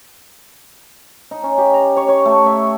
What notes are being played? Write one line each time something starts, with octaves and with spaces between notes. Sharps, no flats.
D#4
C#4
G4
A#5
C#5
C#5
A3
E5